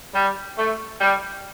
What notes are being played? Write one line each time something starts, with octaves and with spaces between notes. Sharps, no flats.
G3
A3
G3